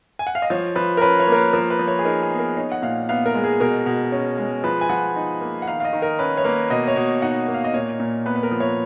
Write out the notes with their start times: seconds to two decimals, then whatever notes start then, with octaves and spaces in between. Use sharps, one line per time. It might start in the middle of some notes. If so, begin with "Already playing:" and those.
0.19 G#5
0.27 F#5
0.35 F5
0.42 D#5
0.50 F3 C#5
0.76 F3 B4
0.97 A#4
1.02 C#4 B4
1.20 C#5
1.27 A#3
1.32 A#4
1.36 B4
1.53 F3 A#4
1.70 B4
1.79 F3
1.88 C#5
1.99 G#4
2.05 D#4 A#4
2.22 G#4
2.31 B3
2.39 A#4
2.57 D#4 C#5
2.72 F#5
2.82 A#2 F5
3.09 B3 F5
3.26 A#4
3.34 G#3
3.44 G#4
3.60 B2 A#4
3.86 B2
4.12 C#4
4.38 G#3
4.64 F3 B4
4.81 G#5
4.89 F3 F#5
5.16 D#4
5.41 A#3
5.62 F#5
5.67 D#3 F5
5.80 F5
5.85 D#5
5.93 D#3
6.02 A#4
6.19 C#4 B4
6.37 C#5
6.45 A#3 B4
6.70 B2 D#5
6.88 C#5
6.96 B2
7.22 D#4 F#5
7.48 A#3
7.54 F5
7.64 D#5
7.74 A#2 C#5
8.00 A#2
8.26 B3 B4
8.36 B4
8.43 A#4
8.52 F3
8.60 C#5